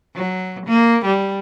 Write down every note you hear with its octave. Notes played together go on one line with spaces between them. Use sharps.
F#3
A#3
G3